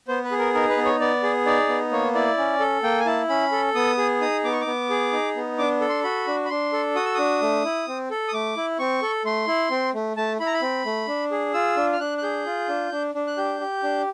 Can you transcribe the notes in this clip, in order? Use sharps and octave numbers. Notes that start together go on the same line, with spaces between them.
B3 C5
B4
G#4
A#4
D#4 A#4
B4
B3
C#5
B3 D5
G#4
D#4 D5
B3
A#3 C#5
E4 D5
C#4
A4
A#3 G5
G#5
E4 A5
C#4 B5
A4
B3 D#6
G#4
D#4 D#6
B3 D6
C#6
D6
B3
G#4
D#4
B3
D4 D6
A4
C6
F#4 B5
D4
B5
D4 C6
A4
F#4 D#6
E6
D4 D#6
A3
E4
C4
A4
D#6
A3 D6
E4
C4 C#6
A4
A3 C6
E4
C4
A3
A3 A5
E4 B5
A#5
B5
C4
A3
D4
G#4
F4 E6
D4
F6
D4 F#6
F#6
G#4 G6
F4
D4
D4
D4
F#6
G4 G6
G4
D4